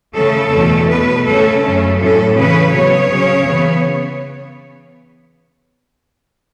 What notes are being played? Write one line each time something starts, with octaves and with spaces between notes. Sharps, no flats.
C#3 A3 C#4 A4
E2 B2 A3 C#4
B2 B3 B4
C#3 A3 C#4 A4
F#2 C#3 A3 C#4
A2 F#3 C#4 A4
C#3 E3 C#4 B4
C#3 F#3 B3 C#5
C#3 F#3 C#4
C#3 E3 B3